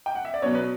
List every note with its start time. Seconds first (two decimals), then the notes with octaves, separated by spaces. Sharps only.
0.06 G5
0.15 F#5
0.25 E5
0.34 D5
0.42 B2 F#3 B3 C#5
0.55 B4